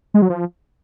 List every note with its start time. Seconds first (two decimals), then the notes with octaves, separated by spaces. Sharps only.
0.14 G#3
0.22 F#3
0.30 F3